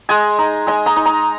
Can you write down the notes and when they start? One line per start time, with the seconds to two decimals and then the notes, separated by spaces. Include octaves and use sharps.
0.09 G#3 D#5 G#5
0.39 D#4
0.67 G#3 D#5 G#5
0.86 A#5 D#6
0.96 D#4
1.05 A#5 D#6